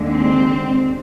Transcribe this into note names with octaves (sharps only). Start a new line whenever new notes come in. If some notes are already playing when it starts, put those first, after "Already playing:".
Already playing: D#2 D3 G#3
C4